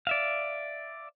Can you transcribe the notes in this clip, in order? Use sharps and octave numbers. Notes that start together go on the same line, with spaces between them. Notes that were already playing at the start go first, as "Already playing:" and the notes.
D5 E5 F5